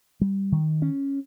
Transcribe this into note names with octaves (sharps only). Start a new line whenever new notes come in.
G3
D#3
C#4